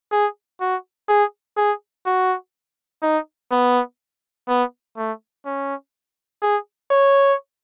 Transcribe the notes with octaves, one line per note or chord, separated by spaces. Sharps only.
G#4
F#4
G#4
G#4
F#4
D#4
B3
B3
A3
C#4
G#4
C#5